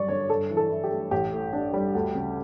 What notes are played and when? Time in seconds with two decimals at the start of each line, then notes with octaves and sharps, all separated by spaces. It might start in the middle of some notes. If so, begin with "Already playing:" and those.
Already playing: G1 F#2 G3 D5 C#6
0.08 D3 C#5
0.29 G2 A4
0.50 E3
0.57 A4
0.70 E4
0.84 G4
0.91 A3
1.11 A1 G4
1.32 A2
1.53 D4
1.74 G3
1.95 D2
2.15 C#3